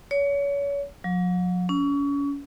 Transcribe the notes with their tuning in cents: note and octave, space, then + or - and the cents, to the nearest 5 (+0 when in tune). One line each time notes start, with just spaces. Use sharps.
C#5 +30
F#3 -45
C#4 +35